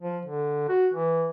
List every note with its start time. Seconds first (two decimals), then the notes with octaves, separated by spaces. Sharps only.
0.02 F3
0.26 D3
0.69 F#4
0.94 E3